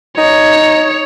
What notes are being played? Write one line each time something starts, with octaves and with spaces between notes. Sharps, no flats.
D#4 C#5